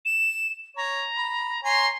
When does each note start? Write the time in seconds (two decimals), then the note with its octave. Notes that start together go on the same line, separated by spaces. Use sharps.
0.05 E7
0.77 C#5 A#5
1.17 B5
1.64 C#5 G#5 A#5 C6